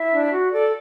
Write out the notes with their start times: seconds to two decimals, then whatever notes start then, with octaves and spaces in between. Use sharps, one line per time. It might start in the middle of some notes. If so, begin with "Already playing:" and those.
Already playing: E4 E5
0.11 D4
0.31 F#4
0.51 A4 D5